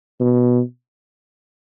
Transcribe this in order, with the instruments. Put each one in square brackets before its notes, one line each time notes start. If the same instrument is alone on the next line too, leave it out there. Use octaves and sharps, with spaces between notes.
[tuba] B2